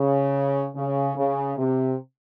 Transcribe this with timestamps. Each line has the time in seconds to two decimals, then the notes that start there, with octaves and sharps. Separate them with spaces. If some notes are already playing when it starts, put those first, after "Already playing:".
Already playing: C#3
0.76 C#3
1.16 C#3
1.57 C3